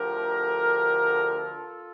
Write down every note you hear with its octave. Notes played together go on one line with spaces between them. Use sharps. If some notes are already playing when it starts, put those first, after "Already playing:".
Already playing: D2 D3 F3 G4 A#4
F4 A4